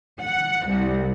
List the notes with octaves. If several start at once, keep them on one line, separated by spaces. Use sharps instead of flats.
F#5
C2